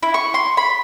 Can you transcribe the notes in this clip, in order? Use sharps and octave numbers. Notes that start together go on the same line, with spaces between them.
E4
C#6
C6
B5